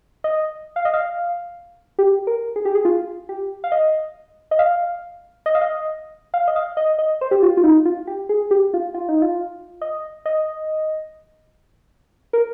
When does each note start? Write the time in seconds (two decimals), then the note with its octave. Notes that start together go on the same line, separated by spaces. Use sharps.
0.24 D#5
0.76 F5
0.85 D#5
0.93 F5
1.99 G4
2.27 A#4
2.56 G#4
2.65 G4
2.75 G#4
2.85 F4
3.29 G4
3.64 F5
3.72 D#5
4.51 D#5
4.59 F5
5.46 D#5
5.55 F5
5.61 D#5
6.34 F5
6.48 D#5
6.56 F5
6.77 D#5
6.99 D#5
7.21 C5
7.31 G4
7.43 F4
7.57 F4
7.64 D#4
7.85 F4
8.07 G4
8.29 G#4
8.51 G4
8.74 F4
8.94 F4
9.09 D#4
9.22 F4
9.82 D#5
10.26 D#5
12.33 A#4